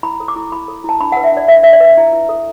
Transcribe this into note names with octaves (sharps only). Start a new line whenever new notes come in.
E4 B5
A4
D6
E4
E4 B5
A4
E4 A5
D4 B5
B4 F#5
E5
D4 D5
B4 E5
D4 E5
D5
B4
E4
E4
A4